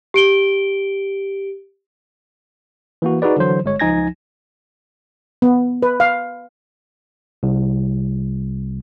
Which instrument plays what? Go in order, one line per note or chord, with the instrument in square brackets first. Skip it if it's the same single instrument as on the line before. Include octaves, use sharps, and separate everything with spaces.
[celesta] G4 D7 G7
[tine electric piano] E3 A#3 F#4
D#4 F#4 G#4 B4 D5
D3 E3 F#3 C5
G1 G#3 C#5
C#2 F3 D#4 G#5 G#6 A#6
[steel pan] B3
B4
F5
[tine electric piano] C2